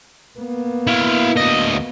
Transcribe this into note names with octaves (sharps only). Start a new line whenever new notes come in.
A#3 B3
E4 F5
D2 D#5